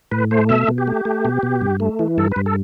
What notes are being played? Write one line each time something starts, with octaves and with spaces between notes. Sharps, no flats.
A2 B4
A3 C5
B2 E5
B2
G4
A3
A3
B2
B2
G2
A3
E3
G2 A4
G2 B4
A4